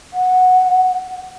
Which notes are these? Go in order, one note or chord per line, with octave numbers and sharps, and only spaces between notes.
F#5